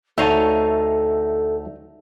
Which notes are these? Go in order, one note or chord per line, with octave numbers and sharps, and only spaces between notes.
D2 D#4 A4 C#5 E5 F5 G#5 A5